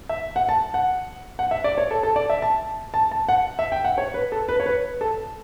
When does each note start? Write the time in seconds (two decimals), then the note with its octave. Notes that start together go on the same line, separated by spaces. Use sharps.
0.09 E5
0.36 F#5
0.49 A5
0.74 F#5
1.39 F#5
1.51 E5
1.64 D5
1.78 C#5
1.91 A4
2.03 A4
2.16 D5
2.30 E5
2.42 A5
2.94 A5
3.11 A5
3.29 F#5
3.59 E5
3.72 G5
3.84 F#5
3.98 C#5
4.14 B4
4.32 A4
4.49 B4
4.60 C#5
4.66 B4
5.01 A4